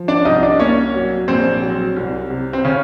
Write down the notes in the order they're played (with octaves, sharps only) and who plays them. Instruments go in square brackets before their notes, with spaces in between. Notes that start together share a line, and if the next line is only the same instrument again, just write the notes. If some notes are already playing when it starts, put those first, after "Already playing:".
Already playing: [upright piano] F3
[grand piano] D4 D5
[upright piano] C2 [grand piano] D#4 D#5
[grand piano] D4 D5
[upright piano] A#3 [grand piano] C#4 C#5
[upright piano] F#3
[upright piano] A#1 [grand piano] C4 C5
[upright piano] F#3
C2
C3
[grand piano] C4
C#3 C#4